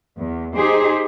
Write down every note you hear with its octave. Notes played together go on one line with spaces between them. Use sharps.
E2
D#4 G4 G#4 C5